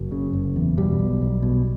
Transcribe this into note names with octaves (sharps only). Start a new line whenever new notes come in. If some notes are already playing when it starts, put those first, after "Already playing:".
Already playing: F#1 F#3
C#3
F#1
E2
B2 G3
B1
B1
B2